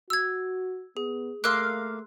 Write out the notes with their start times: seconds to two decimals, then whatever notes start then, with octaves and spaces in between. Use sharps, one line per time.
0.10 F#4 E6 G#6
0.97 B3 G#4
1.44 A3 A#3 F5 C6 E6 F#6